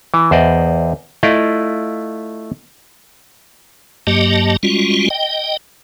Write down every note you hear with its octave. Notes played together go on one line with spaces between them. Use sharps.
E3
E2 C5 D5 D#5
A3 E4 F4 D5 D#5 F5
G2 F#3 A#3 G4 D#5 A5
G3 G#3 C#4 F4 F#4
D#5 G5